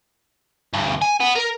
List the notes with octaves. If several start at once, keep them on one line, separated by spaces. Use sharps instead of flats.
D2 G2
G#5
B3
A#4